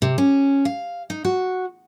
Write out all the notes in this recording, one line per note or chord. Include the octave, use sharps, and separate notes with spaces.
C3
C#4
F5
D#4
F#4